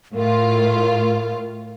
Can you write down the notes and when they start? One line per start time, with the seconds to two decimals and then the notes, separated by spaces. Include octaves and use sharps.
0.15 A2 F4 A#4